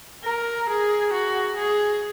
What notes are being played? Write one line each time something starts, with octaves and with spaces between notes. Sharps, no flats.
A#4
G#4
F#4
G#4